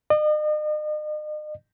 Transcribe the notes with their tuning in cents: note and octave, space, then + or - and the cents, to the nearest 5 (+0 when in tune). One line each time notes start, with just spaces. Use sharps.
D#5 -40